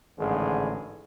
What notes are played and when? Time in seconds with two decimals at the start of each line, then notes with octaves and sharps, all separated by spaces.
0.18 A1 G#2 D3 D#3 G#4